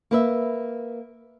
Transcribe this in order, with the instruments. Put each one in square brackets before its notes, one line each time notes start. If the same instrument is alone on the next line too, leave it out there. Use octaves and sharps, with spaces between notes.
[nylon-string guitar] A#3 B4 E5